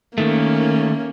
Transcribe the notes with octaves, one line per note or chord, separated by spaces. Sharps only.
D#3 A3 A#3 C#4